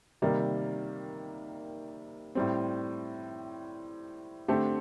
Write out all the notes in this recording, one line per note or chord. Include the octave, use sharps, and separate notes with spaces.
C3 D#3 G3 A#3
A2 G3 C4
D3 A3 C4 G4